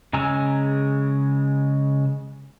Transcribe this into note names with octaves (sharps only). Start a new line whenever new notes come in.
C#3 G#3 G#5 A#5 E6